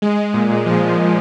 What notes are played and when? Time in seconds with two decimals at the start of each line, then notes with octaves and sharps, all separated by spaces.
0.02 G#3
0.17 G#3
0.34 A#2
0.49 A#2
0.66 F3